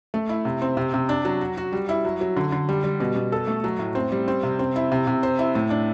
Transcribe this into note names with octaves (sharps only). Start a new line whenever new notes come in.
A3
E4
C3
C4
C3
C3
D4
F#3
F#4
F#4
G3
E4
F#3
F#3
D3
D3
G3
G3
B2
B2
A4
A3
F#3
A2
C4
G3
C4
C3
C4
E4
C3
C3
C5
E4
A2
D4